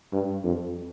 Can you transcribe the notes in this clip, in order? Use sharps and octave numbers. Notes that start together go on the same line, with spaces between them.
G2
F2